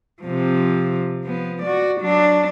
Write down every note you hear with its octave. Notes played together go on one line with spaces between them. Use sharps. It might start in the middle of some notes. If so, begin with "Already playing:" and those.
C3 F3
F3 B3
F#4 D5
F#3 D4